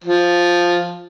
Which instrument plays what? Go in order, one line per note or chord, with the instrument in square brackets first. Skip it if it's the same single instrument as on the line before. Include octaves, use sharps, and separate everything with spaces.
[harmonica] F3